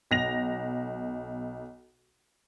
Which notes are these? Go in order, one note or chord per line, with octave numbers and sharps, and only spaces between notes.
B1 A#6 F7